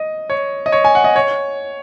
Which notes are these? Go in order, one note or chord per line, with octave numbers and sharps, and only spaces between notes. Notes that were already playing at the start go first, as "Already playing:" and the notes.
Already playing: D#5
C#5
D#5
C#5
G#5
F#5
D#5
C#5